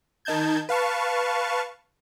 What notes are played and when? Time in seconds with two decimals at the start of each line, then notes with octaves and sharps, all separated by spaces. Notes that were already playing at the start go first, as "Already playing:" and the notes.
0.25 D#3 D#4 A5 G6 G#6
0.69 B4 F5 A5 C#6